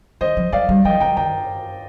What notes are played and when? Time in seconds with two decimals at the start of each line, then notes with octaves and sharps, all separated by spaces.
0.21 D#3 C5 D#5
0.37 F3
0.52 G#3 D5 F5
0.69 G3
0.85 F3 D#5 G5
1.00 F3 G5 A#5
1.17 D#3 G5 A#5